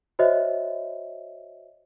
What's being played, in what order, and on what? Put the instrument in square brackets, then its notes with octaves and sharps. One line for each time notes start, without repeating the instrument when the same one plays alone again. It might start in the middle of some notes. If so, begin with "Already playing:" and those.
[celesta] F#4 C5 C#5 D#5 E5